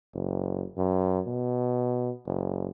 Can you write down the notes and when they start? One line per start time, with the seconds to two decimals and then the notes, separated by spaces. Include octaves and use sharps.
0.14 F#1
0.77 F#2
1.27 B2
2.27 F#1